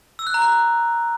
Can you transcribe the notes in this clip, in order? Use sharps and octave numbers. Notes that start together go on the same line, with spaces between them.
E6
F#6
A#5
F#6